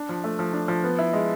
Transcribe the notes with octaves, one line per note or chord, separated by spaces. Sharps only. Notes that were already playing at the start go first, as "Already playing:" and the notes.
Already playing: D4
F3
A3
F3
D4
F3
B3
E4
G#3